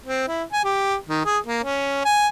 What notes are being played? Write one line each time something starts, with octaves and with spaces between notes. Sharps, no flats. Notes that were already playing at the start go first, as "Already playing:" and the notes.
C4
E4
G#5
G4
D#3
G#4
A#3
C#4
G#5